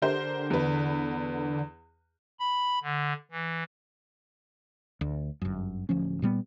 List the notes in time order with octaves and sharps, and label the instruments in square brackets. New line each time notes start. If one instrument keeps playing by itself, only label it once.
[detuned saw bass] D3 [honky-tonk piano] G4 A#4 C5
[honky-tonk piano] E2 B4
[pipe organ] B5
D3
E3
[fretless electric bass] D2
G1 F#2
D1 D2 F3 C#4
A#2 G3 B3